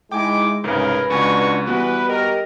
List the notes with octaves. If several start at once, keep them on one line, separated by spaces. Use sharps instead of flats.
G#3 D#4 E4 G5 G#5 D6
C2 G#2 C#3 G#4 A#4 B4
C#2 G#3 D4 F#4 G#5 C#6
E3 G3 B3 F#4 B4
G4 A#4 D#5